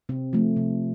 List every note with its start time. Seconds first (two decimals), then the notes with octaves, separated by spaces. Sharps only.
0.09 C3 C4
0.33 F3 A3
0.56 C3